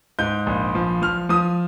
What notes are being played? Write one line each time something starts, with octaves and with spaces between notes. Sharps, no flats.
G#2 G6
A#1
F3
F3 F6
F3 D#6